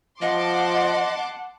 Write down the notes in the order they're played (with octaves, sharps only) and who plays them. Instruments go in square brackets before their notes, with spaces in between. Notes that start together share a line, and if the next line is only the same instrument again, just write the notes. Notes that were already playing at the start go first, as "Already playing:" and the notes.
[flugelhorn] F3 [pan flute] D#5 [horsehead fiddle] F#5 [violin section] A5 C6 D6